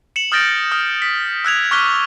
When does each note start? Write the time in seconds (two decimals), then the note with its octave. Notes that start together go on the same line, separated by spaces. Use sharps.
0.16 C#7 E7 F#7
0.32 D#6 F6 G6 A6 A#6 D7
0.72 D#6 F6
1.02 B6
1.45 E6 F#6 G#6 F7
1.71 C#6 D6 F6 F#6 B6 G7